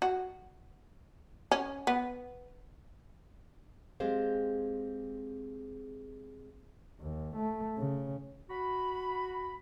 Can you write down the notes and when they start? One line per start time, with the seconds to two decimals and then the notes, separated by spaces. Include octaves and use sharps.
0.02 F#4
1.51 C#4
1.87 B3
4.00 G#3 C4 G4 G#4 C5 F5
7.00 D#2
7.36 A3
7.78 C#3
8.50 F#4 B5